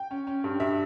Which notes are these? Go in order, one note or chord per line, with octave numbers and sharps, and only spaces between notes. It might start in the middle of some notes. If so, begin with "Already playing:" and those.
Already playing: G5
C#4
C#4
G2
G2 E5